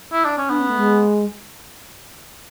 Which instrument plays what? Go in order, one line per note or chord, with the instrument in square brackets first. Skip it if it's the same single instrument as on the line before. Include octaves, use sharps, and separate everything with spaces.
[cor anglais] E4
D4
C#4
[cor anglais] B3 [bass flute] D4
[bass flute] C#4
A3
G#3